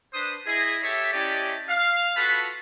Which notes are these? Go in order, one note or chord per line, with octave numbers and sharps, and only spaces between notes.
D4 B4 C5 D#6
E4 G#4 D#5
G4 A4 C#5 E5
C#4 E4 G4 D5 D#5 A5
F5
F4 F#4 A4 B4 A5 B5